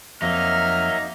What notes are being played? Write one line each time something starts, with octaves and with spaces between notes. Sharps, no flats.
F2 F#3 A#3 D#4 E5 F6